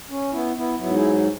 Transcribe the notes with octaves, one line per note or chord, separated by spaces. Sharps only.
C#4
B3 E4
B3 E4
G#2 F#3 B3 E4
E4 G#4